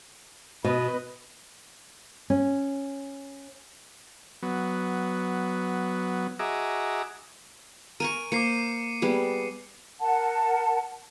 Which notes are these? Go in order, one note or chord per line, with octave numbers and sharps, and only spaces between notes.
B2 B4 D#5
C#4
F#3 B3
F#4 G#4 D#5 E5 A#5 D6
A#4 G#5 C#6 D#7
A#3 C5 D6 C7 C#7
G3 B3 G#4
A#4 F#5 A5